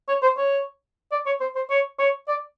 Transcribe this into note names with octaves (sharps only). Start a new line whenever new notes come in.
C#5
C5
C#5
D5
C#5
C5
C5
C#5
C#5
D5